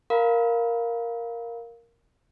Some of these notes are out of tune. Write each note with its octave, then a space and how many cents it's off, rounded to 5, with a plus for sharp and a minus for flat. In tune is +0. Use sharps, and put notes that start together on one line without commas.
A#4 +0 F5 +5 B5 +0